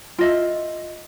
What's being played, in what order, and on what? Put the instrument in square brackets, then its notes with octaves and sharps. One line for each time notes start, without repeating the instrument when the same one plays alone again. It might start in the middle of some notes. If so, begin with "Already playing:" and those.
[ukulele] F4 D#5 E5